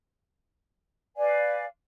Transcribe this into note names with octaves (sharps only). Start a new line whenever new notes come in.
B4 D5 F5 G#5